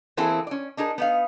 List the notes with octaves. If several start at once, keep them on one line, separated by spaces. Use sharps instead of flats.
E3 A#3 C4 E4 G#4 A4
C#4 D5
D4 D#4 G#4 A#4
B3 D#4 F5